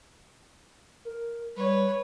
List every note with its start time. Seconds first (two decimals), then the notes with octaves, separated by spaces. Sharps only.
1.05 A#4
1.56 G3 B4 C#5